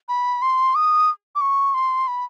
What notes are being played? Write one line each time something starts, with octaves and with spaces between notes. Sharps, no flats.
B5
C6
D#6
D6
C#6
C6
B5